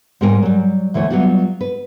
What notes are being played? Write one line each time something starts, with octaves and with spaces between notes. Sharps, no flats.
G#2 G3 A#4 G5 G#5
F#3 G3
D2 E3 A3 C#5
F#3 G3 B3 F4 F#4
B4